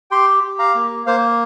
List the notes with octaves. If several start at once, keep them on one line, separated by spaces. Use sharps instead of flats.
G4 G5 C6
G4
F5 A#5
A#3
A#3 C5 F5